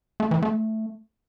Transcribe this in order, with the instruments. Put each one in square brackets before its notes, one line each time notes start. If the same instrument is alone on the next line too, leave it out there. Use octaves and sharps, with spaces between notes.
[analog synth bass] A3
E3
A3